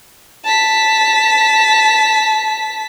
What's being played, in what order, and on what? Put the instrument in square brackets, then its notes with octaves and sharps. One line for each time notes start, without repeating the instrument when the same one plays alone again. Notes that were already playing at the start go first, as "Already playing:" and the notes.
[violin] A5 B6